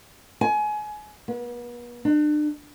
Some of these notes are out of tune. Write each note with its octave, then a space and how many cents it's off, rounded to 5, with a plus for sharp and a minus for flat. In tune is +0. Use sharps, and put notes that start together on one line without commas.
G#5 +25
B3 -40
D4 +35